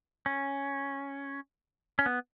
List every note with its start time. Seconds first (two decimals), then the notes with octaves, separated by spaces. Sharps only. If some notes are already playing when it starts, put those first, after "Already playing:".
0.26 C#4
1.99 C#4
2.06 B3